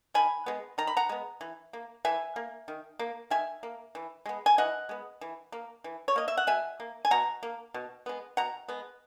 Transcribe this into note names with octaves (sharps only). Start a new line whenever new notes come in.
D#3 G#5 B5
G#3 B3
D#3 A#5
B5
F#5 A#5
G#3 B3
E3
A#3
E3 E5 G#5
A#3
D#3
A#3
D#3 E5 G#5
A#3
E3
G#3 B3
G#5
E3 D#5 F#5
G#3 B3
E3
A#3
E3
C#5
A#3 D#5
E5
F#5
B2 E5 G#5
A#3
G#5
B2 F#5 A#5
A#3
B2
G#3 B3
B2 F#5 A#5
G#3 B3